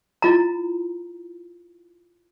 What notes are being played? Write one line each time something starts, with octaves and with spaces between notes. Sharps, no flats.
E4 F4 A#5